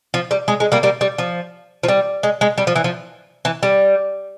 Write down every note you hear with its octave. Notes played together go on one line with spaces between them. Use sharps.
F3
G3
G#3
G#3
G3 A#3
G3 A#3
G3
F3
F3
G3
G#3
G#3
G3
F3
E3
F3
E3
G3